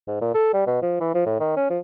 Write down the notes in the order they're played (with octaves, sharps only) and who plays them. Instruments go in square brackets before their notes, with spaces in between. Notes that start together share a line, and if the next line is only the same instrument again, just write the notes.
[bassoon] G#2
A#2
A4
G3
B2
F3
E3
F3
A2
D#3
C#4
F3